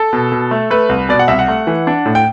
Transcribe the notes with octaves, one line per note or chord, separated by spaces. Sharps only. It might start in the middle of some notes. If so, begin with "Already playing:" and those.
Already playing: A4
B2
B2
A3
A3 B4
C2
B2 D5
F#5
C2 E5
F#5
A3
E3
D4
A2
G5